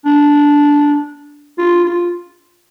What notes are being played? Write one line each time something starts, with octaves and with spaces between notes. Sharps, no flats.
D4
F4
F4